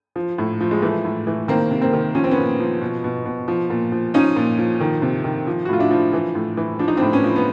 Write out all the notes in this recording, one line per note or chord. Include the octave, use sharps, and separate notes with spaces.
F3
A2
F3
G#3
E3 A3
A2
E3
D#3 A#3 C4
C3
A#3 C4
D#3
F3 C#4
C4
B3 C#4
A#2
F3
B2
B2
B2
F3
A#2
F3
F3 C#4 D#4
A#2
F3
D#3
C3
D#3
F3
F#4
A2 F4
D4 E4
F3
E3
A2
E3
F3 D4
D#4
C4 D4
A2
B3 C#4
F3
B3